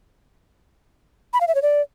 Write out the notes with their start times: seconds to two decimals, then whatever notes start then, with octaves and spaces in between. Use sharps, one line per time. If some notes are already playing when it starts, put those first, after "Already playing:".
1.33 B5
1.41 F5
1.48 E5
1.55 C#5
1.62 D5